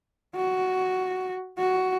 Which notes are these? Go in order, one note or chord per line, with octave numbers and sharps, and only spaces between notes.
F#4
F#4